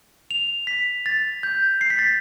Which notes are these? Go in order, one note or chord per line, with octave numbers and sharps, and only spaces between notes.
F7
B6
A6
G6
C7
B6
A6